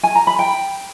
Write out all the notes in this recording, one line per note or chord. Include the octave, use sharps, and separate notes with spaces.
G#5
A#5
B5
G5